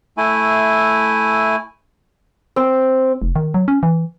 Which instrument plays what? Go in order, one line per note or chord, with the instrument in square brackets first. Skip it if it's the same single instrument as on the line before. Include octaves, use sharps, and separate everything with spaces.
[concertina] A3 E4 G#5
[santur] C4
[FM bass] F1
D#3
F#3
C#4
E3